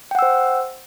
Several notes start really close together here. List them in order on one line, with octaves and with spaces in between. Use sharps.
G5 F#5 E6 C5